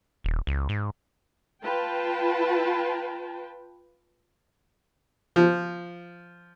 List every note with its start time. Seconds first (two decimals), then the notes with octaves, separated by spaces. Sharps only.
0.24 D#1
0.47 C#2
0.69 G#2
1.62 F4 B4 G5 A5
5.36 F3